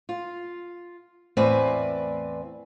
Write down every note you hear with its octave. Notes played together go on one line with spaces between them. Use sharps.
F4
E2 A2 C4 B4 D5 G#5